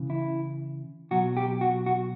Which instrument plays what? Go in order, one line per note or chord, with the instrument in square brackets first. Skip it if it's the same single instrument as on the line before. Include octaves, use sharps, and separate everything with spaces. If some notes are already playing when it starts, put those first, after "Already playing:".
Already playing: [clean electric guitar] C#3 E3
E4
B2 F#3 F#4
G4
F#4
F#4